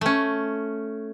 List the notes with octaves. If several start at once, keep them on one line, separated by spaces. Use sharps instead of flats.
A3 C#4